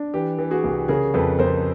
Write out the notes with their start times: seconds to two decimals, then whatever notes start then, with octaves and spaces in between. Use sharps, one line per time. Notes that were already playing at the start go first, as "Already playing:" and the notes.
Already playing: D4
0.14 E3 G4
0.39 E3
0.51 F#4 G#4
0.64 C2
0.88 C#3 G#4 A#4
1.14 F2 A4 B4
1.39 F2 A#4 C5